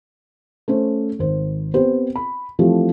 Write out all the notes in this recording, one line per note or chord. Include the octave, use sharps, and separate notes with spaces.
A3 C#4 C5
G#1 C5
B3 C4 G4 C5
B5
E3 F3 A3 C4 F4 G4